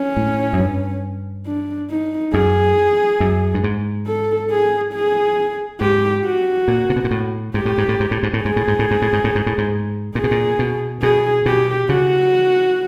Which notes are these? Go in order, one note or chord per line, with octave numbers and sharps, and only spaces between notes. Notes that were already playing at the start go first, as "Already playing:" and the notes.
Already playing: C#4
A2
F#2
G2
D4
D#4
F#2 G#4
F#2
G2
G#2
A4
G#4
G#4
G#2 G4
F#4
A#2
C3
B2
A#2
A2
G#2 G4
A2
G#2
A2
G#2
A2
G#2
A2
G#2 G#4
A2
G#2
A2
G#2
A2
G#2
A2
G#2
A2
G#2
A#2 G#4
B2
A#2
B2
B2 G#4
B2 G4
C#3 F#4